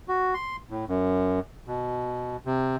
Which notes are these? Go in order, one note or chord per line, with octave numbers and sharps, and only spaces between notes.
F#4
C6
A2
F#2
B2
C3